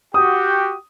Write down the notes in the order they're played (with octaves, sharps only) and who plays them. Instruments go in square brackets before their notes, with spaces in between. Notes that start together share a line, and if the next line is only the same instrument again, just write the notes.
[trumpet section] F#4 G4 [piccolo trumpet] G5 [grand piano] D#6